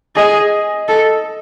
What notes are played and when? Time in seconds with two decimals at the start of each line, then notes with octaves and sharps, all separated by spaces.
0.16 G#4 D#5
0.88 A4